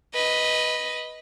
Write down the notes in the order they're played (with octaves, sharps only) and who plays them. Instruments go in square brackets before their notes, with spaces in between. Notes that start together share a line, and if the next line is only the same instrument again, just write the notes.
[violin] B4 D#5